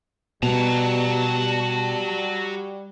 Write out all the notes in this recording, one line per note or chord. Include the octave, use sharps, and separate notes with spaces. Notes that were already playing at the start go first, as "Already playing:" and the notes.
B2 G3 F#4 A5 A#5